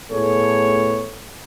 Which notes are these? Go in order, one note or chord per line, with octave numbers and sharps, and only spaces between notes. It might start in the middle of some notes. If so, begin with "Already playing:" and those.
A2 A3 B3 G#4 A4 C#5